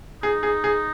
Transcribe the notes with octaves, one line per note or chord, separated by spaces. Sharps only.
D#4 G#4
G#4
G#4